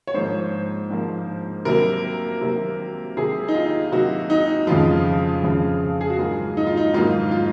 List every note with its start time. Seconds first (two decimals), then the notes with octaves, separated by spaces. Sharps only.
0.07 C#5
0.14 G#2 F3 A#3 C5
0.90 G#2 F3 A#3
1.65 C3 F#3 A#3 A#4
2.41 C3 F#3 A#3
3.17 C3 F#3 A#3 G#4
3.48 D#4
3.54 F4
3.92 C3 F#3 A#3 F#4
4.30 D#4
4.67 F2 C#3 F3 F4
5.43 F2 C#3 F3
6.01 G#4
6.10 F#4
6.18 G#2 F#3 A#3 F4
6.57 D#4
6.67 F4
6.77 D#4
6.94 G#2 F#3 A#3 F4
7.31 F4